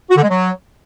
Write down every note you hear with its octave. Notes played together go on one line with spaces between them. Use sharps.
F#4
D3
G#3
F#3